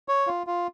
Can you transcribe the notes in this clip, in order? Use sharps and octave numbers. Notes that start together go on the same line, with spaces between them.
C#5
F4
F4